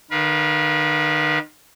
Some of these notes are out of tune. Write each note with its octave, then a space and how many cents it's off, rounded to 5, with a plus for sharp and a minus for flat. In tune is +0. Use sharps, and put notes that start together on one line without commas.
D#3 -35 B4 -35 F5 +0